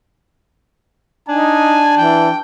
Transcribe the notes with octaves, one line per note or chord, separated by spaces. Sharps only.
D4 D#4 G#5 A5
E3 G5